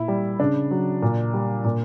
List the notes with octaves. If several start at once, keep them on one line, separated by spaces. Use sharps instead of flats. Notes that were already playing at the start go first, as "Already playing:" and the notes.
Already playing: A#2 E4
G3
C#3 D4
F#3
A#2
G3
A#2